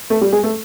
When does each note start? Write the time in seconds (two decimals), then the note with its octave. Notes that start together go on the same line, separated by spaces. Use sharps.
0.10 A3 A4
0.21 G3 G4
0.33 G#3 G#4
0.43 A3 A4